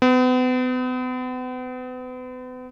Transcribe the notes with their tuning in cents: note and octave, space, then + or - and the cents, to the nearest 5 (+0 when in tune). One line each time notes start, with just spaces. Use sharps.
B3 +40